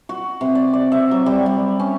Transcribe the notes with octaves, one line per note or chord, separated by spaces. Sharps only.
F#4
C3
D5
D5
E5
F#3
G3
G3
C#4